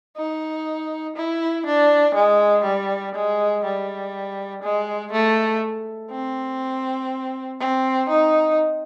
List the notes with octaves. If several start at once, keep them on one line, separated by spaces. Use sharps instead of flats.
D#4
E4
D4
G#3
G3
G#3
G3
G#3
A3
C4
C4
D#4